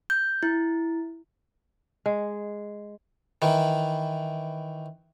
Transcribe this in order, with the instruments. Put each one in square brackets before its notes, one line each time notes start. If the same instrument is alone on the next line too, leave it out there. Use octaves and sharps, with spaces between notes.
[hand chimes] G6
E4
[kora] G#3
[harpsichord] D#3 E3